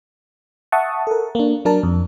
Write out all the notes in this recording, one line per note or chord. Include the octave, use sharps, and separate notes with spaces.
E5 F#5 A5 C#6 D#6
A4 A#4
A#3 D4
F#3 D4 A#4 A5
F2